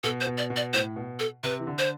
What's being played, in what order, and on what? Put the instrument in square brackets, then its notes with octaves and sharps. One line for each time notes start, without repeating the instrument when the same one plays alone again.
[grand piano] B2 [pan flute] A4
[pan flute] C5
[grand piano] B2
[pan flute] D5
[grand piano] B2
[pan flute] D5
[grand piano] A2 [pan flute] C5
[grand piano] B2
[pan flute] A4
[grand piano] C3 [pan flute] B4
[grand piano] E3
D3
[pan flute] C5